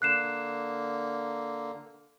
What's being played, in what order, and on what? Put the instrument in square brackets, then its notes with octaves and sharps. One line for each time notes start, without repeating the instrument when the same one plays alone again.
[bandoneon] D3 A#3 [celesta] F#6 C7 E7